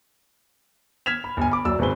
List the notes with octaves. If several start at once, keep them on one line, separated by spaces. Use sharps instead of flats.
F6 G#6 B6 E7 F7
B5
G1 G#5
B5 D6
F#1 F#3 D5 E6
G#1 C4 G#4 B4 G7